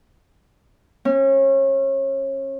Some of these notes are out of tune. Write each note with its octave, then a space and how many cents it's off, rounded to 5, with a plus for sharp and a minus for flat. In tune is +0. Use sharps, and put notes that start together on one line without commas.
C#4 -30